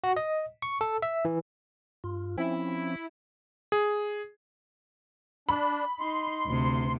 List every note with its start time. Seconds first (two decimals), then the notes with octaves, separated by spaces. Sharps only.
0.04 F#4
0.16 D#5
0.62 C#6
0.81 A4
1.02 E5
1.25 E3
2.04 G2 F4
2.38 F3 C4 C#4 E4
3.72 G#4
5.49 D4 B5
6.00 D#4 C6
6.47 D2 C3